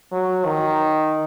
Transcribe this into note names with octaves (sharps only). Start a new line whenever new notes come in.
F#3
D#3